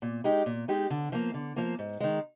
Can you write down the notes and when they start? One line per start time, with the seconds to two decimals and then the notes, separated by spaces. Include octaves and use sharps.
0.02 A#2
0.24 G#3 D#4 G4
0.46 A#2
0.68 G#3 D#4 G4
0.90 D3
1.12 F3 A#3
1.34 D3
1.56 F3 A#3
1.79 G#2
2.00 D#3 G#3